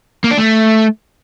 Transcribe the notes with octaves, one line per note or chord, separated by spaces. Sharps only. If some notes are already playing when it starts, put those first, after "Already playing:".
A#3
D4
A3